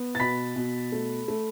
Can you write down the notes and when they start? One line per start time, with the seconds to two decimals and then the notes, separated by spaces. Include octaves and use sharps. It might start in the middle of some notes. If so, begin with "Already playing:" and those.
Already playing: B3
0.15 A6
0.20 B2 B5 B6
0.56 B2
0.92 A3
1.28 A3